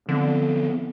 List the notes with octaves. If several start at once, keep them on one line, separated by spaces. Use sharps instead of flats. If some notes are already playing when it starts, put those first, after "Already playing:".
D3 F3 B3 C4